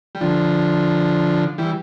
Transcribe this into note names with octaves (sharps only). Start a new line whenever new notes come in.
G3
D3 F3
E3 G3